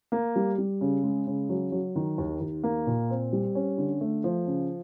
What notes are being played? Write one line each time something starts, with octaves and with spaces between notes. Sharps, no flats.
A#3
G3
G3
C#3
G#3
C#3
F#3
F#3
D#3
D#2
D#2
A#3
A#2
C4
G3
C#4
D3
A3
F3
C#3